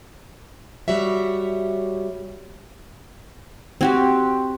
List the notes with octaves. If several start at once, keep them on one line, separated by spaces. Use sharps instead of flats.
G3 F#4 C#5 E5
C4 F#4 G4